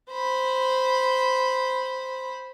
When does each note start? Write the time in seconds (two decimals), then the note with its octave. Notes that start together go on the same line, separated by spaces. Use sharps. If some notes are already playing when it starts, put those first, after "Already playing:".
0.11 C5 B5